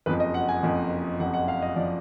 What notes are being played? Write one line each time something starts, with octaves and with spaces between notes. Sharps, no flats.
F#1 F2 F3 B4
D#5
F#5
G#5
F#1 F2 F3
F#1 F2 F3 F#5
F#5
F5
D#5
F3 D5